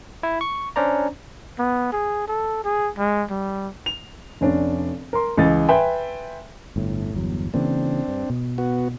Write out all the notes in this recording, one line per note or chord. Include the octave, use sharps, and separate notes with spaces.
E4
C#6
C#4 D4 C5 D5 A#5
B3
G#4
A4
G#4
G#3
G3
F7
F1 C#4 D4
A#4 C6
C#2 E3 D#5 A6
B4 E5 G5 G#5 C6
G1 A2
G1 E2 F#3
C#3 E3 A#3 C4 D4
G2
B2
B3 F#4